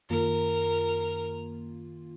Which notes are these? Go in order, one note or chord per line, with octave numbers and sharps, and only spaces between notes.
F#2 D#3 A#3 F4 A#4